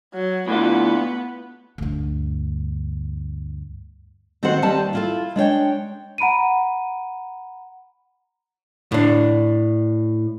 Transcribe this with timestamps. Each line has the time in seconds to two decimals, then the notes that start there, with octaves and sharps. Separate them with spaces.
0.13 F#3
0.48 A2 D3 B3 F4
1.78 D2 G2
4.43 D#3 C4 F#4 A4 C5 F#5
4.62 D#2 G3 C4 A5
4.93 E4 F4 A4
5.36 G#3 D4 C#5 G5
6.18 F#5 A#5 B5 D7 D#7
8.92 A2 D4